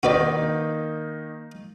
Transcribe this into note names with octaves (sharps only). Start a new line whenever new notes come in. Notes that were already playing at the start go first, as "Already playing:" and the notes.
D#3 A#3 D#4 F#4 B4 D5